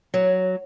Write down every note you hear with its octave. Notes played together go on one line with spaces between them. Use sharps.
F#3